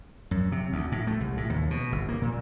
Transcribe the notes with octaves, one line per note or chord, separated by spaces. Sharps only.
F#2
C3
D2
A2
A3
C2
A2
D#2
B2
G1
A#3
A#2